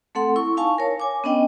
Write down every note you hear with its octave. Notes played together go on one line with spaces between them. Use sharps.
A3 C4 A4 F#5 C6
E4 C#6
D#4 F5 G#5 A5 C#6
A#4 C#5
C#5 G#5 D6
B3 C#4 D4 D#5 G5